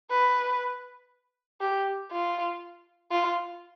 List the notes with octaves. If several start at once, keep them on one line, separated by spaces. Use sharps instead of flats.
B4
G4
F4
F4